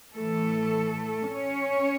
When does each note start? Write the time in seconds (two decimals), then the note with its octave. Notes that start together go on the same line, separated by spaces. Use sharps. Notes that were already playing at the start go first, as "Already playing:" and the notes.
0.14 A2 E3 A3 A4
1.33 C#4 C#5